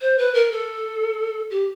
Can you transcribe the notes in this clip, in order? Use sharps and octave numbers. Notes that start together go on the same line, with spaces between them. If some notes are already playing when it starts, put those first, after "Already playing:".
C5
B4
A#4
A4
G4